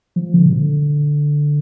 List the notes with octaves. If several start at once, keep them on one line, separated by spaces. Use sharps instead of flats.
F3
D3
B2
D3